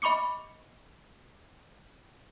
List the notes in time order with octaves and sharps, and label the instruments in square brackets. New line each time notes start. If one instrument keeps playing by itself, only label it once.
[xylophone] D#5 B5 C#6 D6 C#7